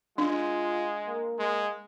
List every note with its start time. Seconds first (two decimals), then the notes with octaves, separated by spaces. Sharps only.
0.18 G#3 D4 F4
1.07 A#3
1.39 G#3